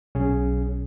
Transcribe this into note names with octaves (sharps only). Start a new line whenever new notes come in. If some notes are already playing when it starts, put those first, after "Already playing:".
B1 C#4 G#4